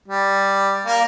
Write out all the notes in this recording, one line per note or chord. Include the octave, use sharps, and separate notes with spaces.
G3
A#3